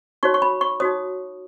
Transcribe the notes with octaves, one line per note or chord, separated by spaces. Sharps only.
D#4 F#4 C#5 C#6
C#6
B5
C#6
D#4 F#4 C#5 D#6